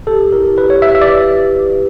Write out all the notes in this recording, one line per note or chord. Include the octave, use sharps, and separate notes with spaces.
G4 A4
E4 A#4
G4 B4
C#5
B4 E5
E5
D5